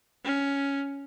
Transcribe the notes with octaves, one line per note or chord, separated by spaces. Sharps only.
C#4